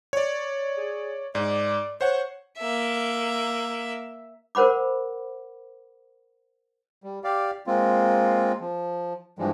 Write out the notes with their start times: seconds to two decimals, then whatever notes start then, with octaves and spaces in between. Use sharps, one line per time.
0.13 C#5 D5
0.77 G#4
1.35 G#2 D5
2.01 C5 C#5 F#5
2.59 A#3 E5
4.55 A#4 C5 F#5 B5 D6
7.04 G3
7.24 G4 D5 F5
7.67 G#3 A#3 C4 F4
8.60 F3
9.39 G2 E3 F3 G3 G#3